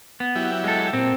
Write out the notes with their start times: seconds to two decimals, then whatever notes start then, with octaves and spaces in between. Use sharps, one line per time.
0.20 B3
0.35 F#3 E4 G4
0.64 G#3 A4
0.93 A#2 C4